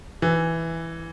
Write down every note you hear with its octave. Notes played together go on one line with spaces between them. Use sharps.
E3